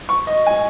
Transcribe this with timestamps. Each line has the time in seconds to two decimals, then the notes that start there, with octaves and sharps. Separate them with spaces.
0.09 C#6
0.27 D#5
0.46 G#5